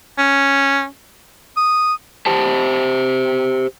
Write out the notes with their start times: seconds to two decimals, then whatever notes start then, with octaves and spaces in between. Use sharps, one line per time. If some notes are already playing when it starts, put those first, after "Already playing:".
0.18 C#4
1.57 D#6
2.26 G4 C5 A5